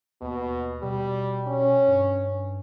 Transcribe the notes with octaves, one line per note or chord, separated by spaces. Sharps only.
D#2 B2
B2 G3
C#4
G2